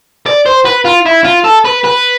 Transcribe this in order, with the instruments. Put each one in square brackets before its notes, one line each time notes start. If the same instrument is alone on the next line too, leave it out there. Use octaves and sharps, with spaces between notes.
[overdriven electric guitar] D5
C5
B4
F4
E4
F4
A4
B4
B4